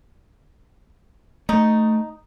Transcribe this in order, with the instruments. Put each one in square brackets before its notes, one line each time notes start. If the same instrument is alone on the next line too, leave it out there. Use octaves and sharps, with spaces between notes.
[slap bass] A3 [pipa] D#4